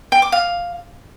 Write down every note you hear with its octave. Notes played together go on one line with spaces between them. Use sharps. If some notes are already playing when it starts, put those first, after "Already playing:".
G5
D6
F5